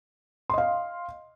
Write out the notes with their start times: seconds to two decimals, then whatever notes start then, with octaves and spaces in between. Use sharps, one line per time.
0.50 C6
0.54 D#5
0.58 F5